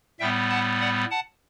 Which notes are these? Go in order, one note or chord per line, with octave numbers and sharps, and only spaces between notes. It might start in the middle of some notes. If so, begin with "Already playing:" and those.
A2 G3 B3 E5 G5
F#5 A5
D5 F#5
F#5 A5